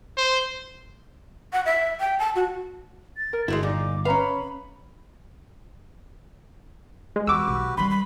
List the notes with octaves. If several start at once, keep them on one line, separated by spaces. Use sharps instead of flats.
C5
F#5
E5
G5
A5
F#4
A6
A#4
G1 G#3 A3 E4 F#4
A#2 D#4 D5 D6
C#4 B4 E5 F5 A#5 B5
G#3
E2 F#4 G4 B4 D6 E6
B1
D#3 G3 B5 C6
B5